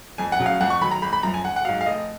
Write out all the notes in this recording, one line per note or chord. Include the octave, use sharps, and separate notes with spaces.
F2 G#5
F#5
C#3 F#3
F5
F2 F#5
C#6
D#3 F#3 B5
A#5
G#1 B5
B5
F#2 F3 A#5
G#5
G#1 F#5
F#5
G#2 F#3 F5
F5
F1 D#5